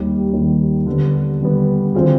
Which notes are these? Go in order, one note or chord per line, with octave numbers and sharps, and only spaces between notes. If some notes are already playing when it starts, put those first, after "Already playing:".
Already playing: D#2 D#3 G3
D#2 D#3 G3
D3 G3 B3
D3 G3 B3
D3 F3 C4 F4 G#4